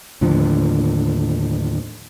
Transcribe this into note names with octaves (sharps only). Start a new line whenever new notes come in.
D#2 A2 D3 F3